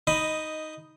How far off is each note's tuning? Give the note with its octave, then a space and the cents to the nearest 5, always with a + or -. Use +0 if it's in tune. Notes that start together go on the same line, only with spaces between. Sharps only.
D#4 +10 D#5 +0 B5 +0